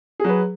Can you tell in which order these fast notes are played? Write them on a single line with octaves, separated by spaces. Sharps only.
G#4 F#3 B4